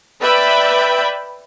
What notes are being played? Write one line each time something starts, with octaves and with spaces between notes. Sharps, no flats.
B4 D5 E5 G5 B5